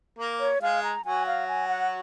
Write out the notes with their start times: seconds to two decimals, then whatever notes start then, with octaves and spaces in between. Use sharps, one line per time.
0.19 A#3 A#4
0.40 C#5
0.62 G#3 G#4 F5
0.83 A#5
1.04 F#3 F#4 G#5
1.27 F5
1.48 G#5
1.68 F#5